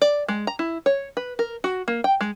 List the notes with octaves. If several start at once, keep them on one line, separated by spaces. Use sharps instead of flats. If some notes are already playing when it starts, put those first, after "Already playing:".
D5
G#3
A#5
E4
C#5
B4
A#4
F#4
A#3
G5
G#3